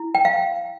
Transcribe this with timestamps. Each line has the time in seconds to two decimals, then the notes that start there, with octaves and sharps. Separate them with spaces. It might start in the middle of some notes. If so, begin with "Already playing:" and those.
Already playing: E4
0.15 G5
0.25 F5